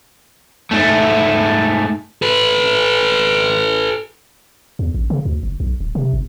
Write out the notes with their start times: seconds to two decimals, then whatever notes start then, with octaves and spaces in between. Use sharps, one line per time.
0.71 G#2 A3
2.22 A4 B4
4.79 E2
4.94 A1
5.10 C#3
5.25 D2
5.43 F#1
5.60 B1
5.80 D1
5.95 C3
6.13 G1